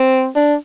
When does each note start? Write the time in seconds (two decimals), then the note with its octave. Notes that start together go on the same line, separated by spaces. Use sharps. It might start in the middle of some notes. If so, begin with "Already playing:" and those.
Already playing: C4
0.36 D4